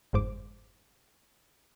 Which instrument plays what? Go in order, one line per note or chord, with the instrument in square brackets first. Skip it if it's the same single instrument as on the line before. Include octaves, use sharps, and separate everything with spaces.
[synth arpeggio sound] G1 F2 G#2 C5 D6